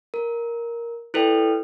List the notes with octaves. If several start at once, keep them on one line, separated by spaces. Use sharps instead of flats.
A#4
E4 A4 B4 D5 G5